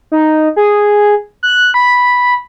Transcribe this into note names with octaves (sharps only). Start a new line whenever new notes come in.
D#4
G#4
F#6
B5